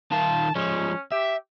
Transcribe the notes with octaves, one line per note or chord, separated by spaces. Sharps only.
D#3 F4 A5
F3 G#3 C#4
G4 E5